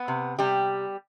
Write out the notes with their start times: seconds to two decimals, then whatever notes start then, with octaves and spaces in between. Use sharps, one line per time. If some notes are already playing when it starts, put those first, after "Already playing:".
Already playing: B3 B4
0.08 C3
0.39 C3 G3 G4